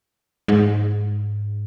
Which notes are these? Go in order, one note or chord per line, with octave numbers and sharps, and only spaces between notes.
G#2